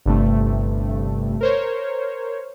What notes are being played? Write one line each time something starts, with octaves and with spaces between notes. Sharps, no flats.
G1 G2 C3 A3
A#4 C5 C#5